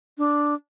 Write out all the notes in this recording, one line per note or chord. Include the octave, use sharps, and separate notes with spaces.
D4